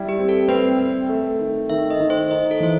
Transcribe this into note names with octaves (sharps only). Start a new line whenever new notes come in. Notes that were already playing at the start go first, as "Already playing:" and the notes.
Already playing: G3 E4
G4
C4
A4
C4 B4
C4
A3
D#3
D#3 E5
D#5
D#3
C5
D#4 D#5
A4
E3 C5